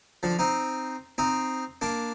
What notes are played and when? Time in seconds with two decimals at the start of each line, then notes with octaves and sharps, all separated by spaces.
0.23 D3 F3
0.39 C4 D#4
1.18 C4 D#4
1.82 A#3 D4